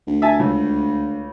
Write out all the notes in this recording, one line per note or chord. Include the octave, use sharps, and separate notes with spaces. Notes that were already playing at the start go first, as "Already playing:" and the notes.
D2
E5 G#5 A5
C#2